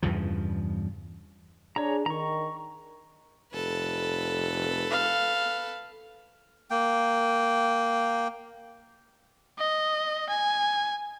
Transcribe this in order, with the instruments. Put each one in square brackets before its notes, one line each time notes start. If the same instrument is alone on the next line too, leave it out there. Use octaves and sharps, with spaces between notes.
[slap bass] E2 G2 C#3 F3
[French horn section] D4 G#4 [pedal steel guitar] C#5 A#5
[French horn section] D#3 [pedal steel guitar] A#5 C#6
[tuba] F1 [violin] A4 B4
[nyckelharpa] F5
[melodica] A#3 G5
[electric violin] D#5
G#5